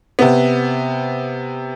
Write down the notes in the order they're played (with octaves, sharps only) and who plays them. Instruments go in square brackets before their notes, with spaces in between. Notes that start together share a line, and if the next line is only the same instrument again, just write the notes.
[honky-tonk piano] C3 B3